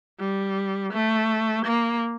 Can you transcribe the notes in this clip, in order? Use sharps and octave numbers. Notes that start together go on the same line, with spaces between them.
G3
A3
A#3